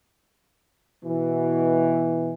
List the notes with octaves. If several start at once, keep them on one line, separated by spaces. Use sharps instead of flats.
B2 E3